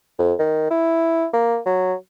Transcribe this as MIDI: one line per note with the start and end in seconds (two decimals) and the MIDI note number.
0.19 0.33 41
0.39 0.67 51
0.70 1.26 64
1.34 1.58 58
1.66 1.94 54